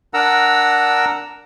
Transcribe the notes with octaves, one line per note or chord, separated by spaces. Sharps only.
D4 A#4 F#5 A#5 E6